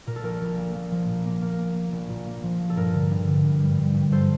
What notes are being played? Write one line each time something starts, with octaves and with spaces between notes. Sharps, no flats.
A#2 A#4
A4
A#1 A#4
A#1
A#3
A#3
F3
A#2
A#3
A#3 A#4
A#3
A#3
A#1
A#2
A#3
F3
A#1
A4
G2 A#4
D3
G2
D3
G2
G3
G2
G2
G3 A4 C5